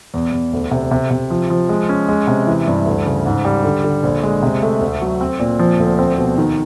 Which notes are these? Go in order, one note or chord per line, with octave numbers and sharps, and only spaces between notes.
E2
E2
D2
C3
C3
C3
F3
F3
G#3
C#4
G#3
C3
E3
G2
D2
C#3
G#2
G3
D3
D3
A#1
G#3
C3
A3
D2
F#3
C4
A#2
F3
D2
C4
B2
D#3